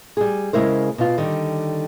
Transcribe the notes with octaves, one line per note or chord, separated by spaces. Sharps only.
G3 G#4
C#3 F3 G#3 E4 A#4 C5
B2 F4
D3 D#3 G3